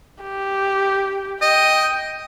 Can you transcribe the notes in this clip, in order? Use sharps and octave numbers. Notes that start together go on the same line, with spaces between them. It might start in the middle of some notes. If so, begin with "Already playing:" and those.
G4
D#5 G5